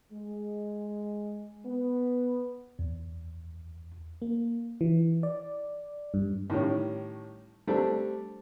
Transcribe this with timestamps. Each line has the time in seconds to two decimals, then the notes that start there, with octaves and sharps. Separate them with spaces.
0.12 G#3
1.66 B3
2.79 E2
4.22 A#3
4.81 E3
5.23 D5
6.14 G2
6.50 A2 D#3 G3 C#4
7.67 G3 A3 C4 D4 A4